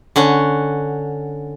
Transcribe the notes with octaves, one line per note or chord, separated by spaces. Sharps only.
D3 C#4 F#5